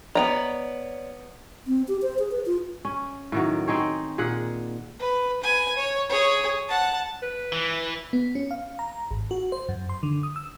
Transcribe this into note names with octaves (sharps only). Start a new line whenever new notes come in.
B3 C#5 D5 G5 A#5
C4
G4
C5
G#4
B4
F4
C#4
A2 D#3 F#3
C4 D#4 G#4 C#5
A#2 G#4 F#5
B4
B4 G#5
C#5
G#4 C#5
F#5 A5
B4
E3
B3
C#4
F5
A#5
G#1
F#4
C5
F#2
C6
D3
D#6
E6